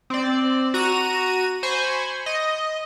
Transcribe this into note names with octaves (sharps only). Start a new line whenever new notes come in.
C4 D5
F#4 A#5 D#7
C5 G#5 B5 C#6
D#5